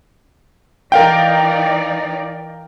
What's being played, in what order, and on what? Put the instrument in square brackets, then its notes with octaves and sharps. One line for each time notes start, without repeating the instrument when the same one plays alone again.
[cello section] E3 D#4 D5 [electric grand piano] A#4 F5 G5